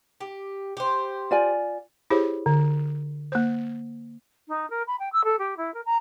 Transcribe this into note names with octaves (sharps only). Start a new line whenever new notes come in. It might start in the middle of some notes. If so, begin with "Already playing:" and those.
G4
G4 C5
F4 D5 G#5
E4 G4 G#4 C5 C#5
D3
A#3 C5
D#4
A#4
B5
G5
E6
A4
G4
E4
A#4
A#5